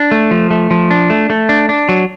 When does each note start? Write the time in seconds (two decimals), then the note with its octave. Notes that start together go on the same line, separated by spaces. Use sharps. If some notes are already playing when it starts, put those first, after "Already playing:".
Already playing: D4
0.11 A3
0.31 F3
0.51 A3
0.71 F3
0.91 D4
1.10 A3
1.30 A3
1.49 D4
1.69 D4
1.89 F#3